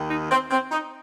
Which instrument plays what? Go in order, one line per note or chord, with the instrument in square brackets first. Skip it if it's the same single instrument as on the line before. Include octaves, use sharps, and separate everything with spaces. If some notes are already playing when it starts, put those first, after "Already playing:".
Already playing: [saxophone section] D#2 D#3
D#4
C4
C4
D#4